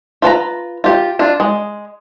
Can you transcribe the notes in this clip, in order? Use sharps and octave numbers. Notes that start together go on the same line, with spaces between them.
F4 B4 A5 A#5
F4 G4
D4 F4
G#3